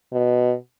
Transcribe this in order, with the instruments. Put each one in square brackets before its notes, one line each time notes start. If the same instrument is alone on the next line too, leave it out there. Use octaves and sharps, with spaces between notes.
[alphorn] B2